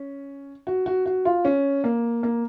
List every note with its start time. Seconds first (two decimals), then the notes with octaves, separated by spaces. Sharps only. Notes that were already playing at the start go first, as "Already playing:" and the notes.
Already playing: C#4
0.67 F#4
0.86 F#4
1.06 F#4
1.25 F4
1.45 C#4
1.84 A#3
2.23 A#3